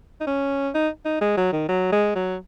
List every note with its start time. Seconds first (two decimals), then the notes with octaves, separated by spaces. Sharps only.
0.20 D#4
0.27 C#4
0.74 D#4
1.05 D#4
1.21 G#3
1.37 F#3
1.52 D#3
1.69 F#3
1.92 G#3
2.15 F#3